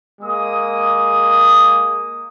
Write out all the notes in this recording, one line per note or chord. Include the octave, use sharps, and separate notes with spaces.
G#3 A#3 D#6